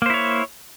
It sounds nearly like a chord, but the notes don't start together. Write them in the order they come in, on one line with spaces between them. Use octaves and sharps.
A#3 C5 E4 C#5